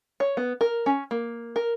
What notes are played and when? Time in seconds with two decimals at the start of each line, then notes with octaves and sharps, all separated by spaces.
0.20 C#5
0.37 B3
0.61 A#4
0.86 C#4
1.11 A#3
1.56 A#4